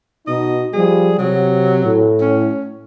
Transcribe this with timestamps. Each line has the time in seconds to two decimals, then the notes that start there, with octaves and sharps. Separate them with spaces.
0.27 B2 D#4 D#5
0.73 F3 G3 G#4
1.19 C3 F#3
1.83 A2
2.21 C#4